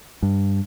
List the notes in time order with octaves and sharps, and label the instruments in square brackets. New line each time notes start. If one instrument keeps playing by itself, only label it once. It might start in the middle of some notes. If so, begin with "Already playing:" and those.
[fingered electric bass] G2